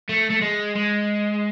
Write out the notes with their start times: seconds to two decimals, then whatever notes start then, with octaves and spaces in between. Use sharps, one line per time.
0.09 A3
0.30 A3
0.42 G#3
0.76 G#3